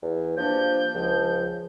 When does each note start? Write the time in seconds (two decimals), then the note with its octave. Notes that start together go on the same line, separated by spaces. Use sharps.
0.02 E2
0.37 F3 G3 A#3 D4 G6
0.95 C#2 F3